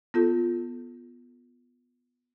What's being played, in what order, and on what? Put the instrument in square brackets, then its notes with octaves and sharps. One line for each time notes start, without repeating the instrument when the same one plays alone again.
[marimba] B3 F4 A4